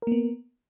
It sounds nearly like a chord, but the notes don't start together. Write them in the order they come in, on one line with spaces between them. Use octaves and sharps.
A#4 A#3 B3